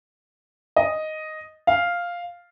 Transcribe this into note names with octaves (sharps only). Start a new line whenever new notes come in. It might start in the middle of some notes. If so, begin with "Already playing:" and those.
D#5
F5